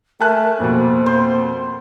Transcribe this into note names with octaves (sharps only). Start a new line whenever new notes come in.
A3 A#4 G#5 A5 F#6
F2 B2 A#3 C4
C5